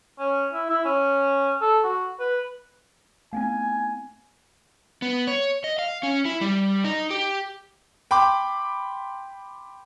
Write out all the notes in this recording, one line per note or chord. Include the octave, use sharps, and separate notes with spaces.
C#4
E4
E4
C#4
A4
F#4
B4
A3 B3 C4 G#5
B3
C#5
D#5
F5
C#4
E4
G3
D#4
G4
G5 B5 C6 D6